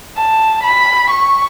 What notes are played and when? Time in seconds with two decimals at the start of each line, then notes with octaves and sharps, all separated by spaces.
0.17 A5
0.64 B5
1.11 C#6